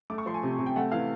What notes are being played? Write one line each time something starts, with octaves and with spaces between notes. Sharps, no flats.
A3 D6
C#6
F3 C6
G#5
C3
C3
G5
A3 F#5
E3 F5